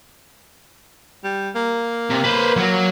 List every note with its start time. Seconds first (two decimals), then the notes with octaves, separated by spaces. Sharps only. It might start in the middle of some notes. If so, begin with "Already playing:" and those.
1.24 G3
1.55 A#3
2.10 C3
2.24 B4 C5
2.57 F#3 F#4